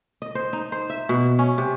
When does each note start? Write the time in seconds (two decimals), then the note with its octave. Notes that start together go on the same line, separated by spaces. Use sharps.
0.22 D#5
0.35 C5
0.53 D#4
0.72 C5
0.90 E5
1.09 B2
1.39 C#4
1.58 C3